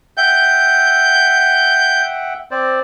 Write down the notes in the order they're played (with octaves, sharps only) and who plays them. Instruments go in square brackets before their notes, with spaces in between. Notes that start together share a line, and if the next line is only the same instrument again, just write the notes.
[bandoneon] E5 F#5 G5 [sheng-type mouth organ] G6
[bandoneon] C4 C5 D5